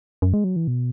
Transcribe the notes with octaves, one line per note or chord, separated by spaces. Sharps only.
F#2
G#3
F#3
E3
B2